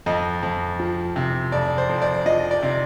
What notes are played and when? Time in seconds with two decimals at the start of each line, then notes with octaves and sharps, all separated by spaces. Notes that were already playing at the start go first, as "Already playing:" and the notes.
0.06 F2 D#5
0.43 F2
0.79 F3
1.16 C3
1.52 F2 D5
1.78 C5
1.89 F2
2.02 D5
2.26 F3 D#5
2.51 D5
2.62 C3